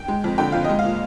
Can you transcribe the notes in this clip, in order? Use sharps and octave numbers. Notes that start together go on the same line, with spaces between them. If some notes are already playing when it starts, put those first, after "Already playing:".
Already playing: G5
G#3
F2
D3 G5
F2 F5
D#5
G#3
F5
A#2